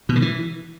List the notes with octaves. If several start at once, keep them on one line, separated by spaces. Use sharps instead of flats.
B2
D3
E3